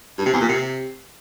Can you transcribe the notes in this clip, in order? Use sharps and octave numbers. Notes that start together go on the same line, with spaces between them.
G2
C3
E2
A#2
C3